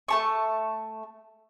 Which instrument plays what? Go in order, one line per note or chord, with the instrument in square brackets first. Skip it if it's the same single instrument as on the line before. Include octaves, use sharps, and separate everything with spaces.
[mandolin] A3 A5 C#6